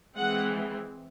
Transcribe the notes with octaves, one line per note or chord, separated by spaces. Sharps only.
E3 G#3 C4 F#5